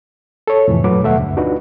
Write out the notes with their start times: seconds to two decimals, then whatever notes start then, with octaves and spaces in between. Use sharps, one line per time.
0.47 A4 C#5
0.68 F2 A2 C3 E3
0.84 F#2 A#2 F#3 A3 B4 D6
1.02 D#2 B2 A3 E5 F#5
1.18 D2 G2
1.37 D4 D#4 F4 F#4 B4